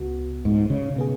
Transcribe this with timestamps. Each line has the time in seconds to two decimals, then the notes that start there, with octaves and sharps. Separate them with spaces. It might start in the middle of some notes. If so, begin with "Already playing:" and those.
Already playing: C#2 C#3 B3 F#4
0.45 G#2
0.70 C#3
0.96 B2 B3 G#4